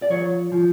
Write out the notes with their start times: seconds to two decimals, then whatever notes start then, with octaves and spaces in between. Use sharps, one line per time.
0.02 D5
0.10 F3 C#5
0.52 F3